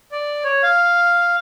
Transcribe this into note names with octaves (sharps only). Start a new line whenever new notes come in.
D5
C#5
F5